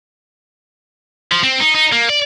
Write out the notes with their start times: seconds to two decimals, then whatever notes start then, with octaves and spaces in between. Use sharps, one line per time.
1.32 F3
1.44 C4
1.60 D#4
1.75 D#4
1.93 A#3
2.10 D5